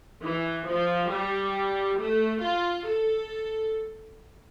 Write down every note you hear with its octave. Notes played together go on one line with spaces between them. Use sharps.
E3
F3
G3
A3
F4
A4